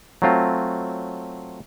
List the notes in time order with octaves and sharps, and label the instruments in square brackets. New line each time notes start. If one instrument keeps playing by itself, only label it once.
[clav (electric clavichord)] F#3 A3 C4 F4